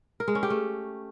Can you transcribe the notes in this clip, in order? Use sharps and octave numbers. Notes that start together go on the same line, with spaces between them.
A#4
G#3
C#4
G4
A3